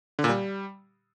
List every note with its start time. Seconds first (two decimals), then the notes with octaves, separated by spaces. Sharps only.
0.19 D3
0.24 A#2
0.29 G3